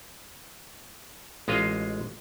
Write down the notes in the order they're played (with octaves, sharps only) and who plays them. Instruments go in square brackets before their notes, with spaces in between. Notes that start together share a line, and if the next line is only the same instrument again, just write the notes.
[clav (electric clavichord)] A1 G#3 F4 D#5 F5